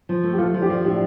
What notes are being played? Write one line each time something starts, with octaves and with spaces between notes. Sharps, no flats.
F3
A3
G4
F3 F4 A4
F3
D4 G4
F3
A2 D4 G4